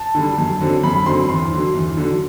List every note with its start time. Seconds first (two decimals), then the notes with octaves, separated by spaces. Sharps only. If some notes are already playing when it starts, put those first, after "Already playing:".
Already playing: A5
0.15 D3 G3
0.38 F#2
0.60 D3 F#3 C4
0.83 F#2 B5
1.06 D3 F#3 C4 C6
1.29 E2 C6
1.51 D3 F#3
1.74 E2
1.97 D3 F#3